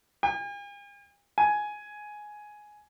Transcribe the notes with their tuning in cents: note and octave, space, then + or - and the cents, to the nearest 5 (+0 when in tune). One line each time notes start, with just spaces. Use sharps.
G#5 -45
G#5 +10